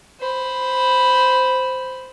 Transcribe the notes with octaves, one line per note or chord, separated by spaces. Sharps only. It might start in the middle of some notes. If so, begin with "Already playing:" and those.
C5 B5